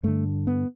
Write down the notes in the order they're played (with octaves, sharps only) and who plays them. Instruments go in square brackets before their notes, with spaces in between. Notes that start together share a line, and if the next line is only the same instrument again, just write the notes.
[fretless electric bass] G2 D3 A3
B3